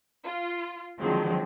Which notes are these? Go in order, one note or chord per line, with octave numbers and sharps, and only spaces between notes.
F4
D3 D#3 F3 F#3 G#3 C4